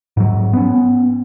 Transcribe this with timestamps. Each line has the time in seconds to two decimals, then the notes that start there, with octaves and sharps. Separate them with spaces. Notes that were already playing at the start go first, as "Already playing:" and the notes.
0.17 G#2 F#3
0.53 B3 C#4